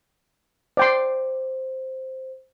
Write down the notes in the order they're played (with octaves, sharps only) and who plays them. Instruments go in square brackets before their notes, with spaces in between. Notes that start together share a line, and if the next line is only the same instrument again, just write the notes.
[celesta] C5 [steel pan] D5 G5 C6